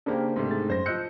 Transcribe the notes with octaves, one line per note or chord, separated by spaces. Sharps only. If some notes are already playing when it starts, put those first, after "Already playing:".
C#3 A#3 D4 G4 A#4 C5
G#2 C3 A3
D#4 G#4 A6
F#2 C5 A#6
F3 D#5 E6 F#6 G6 C#7